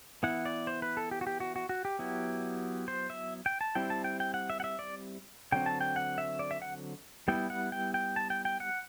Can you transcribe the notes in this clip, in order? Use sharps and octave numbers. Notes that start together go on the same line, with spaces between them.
E3 B3 E4 F#5
D5
C5
B4
A4
G4
F#4
G4
F#4
F#4
F#4
G4
F#3 B3 E4
C5
E5
G5
A5
G3 C4 E4 G5
A5
G5
G5
F#5
E5
F#5
E5
D5
D3 F#3 C4 G5
A5
G5
F#5
E5
D5
E5
F#5
G3 B3 E4 G5
F#5
G5
G5
A5
G5
G5
F#5